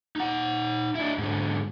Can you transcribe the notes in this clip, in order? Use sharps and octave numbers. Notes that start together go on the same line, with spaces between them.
D#4 F#5
D4 E4
G#2 D3